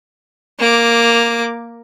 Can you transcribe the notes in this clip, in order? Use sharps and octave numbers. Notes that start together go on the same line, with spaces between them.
A#3 D6